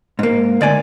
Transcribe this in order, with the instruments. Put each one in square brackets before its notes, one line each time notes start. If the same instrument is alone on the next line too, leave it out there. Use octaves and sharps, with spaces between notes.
[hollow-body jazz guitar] G#2 A#3
D2 D5 G#5